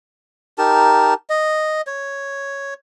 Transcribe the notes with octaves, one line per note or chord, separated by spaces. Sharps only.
D#4 G4 A#4 A5
D#5
C#5